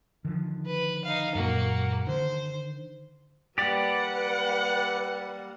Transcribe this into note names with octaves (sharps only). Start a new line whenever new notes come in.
D3 D#3 F3
B4
D#4 F5
F#2 A#2 A#3 F#4
D3 D#3 C5
G3 A#3 G4 B4 D5 F#5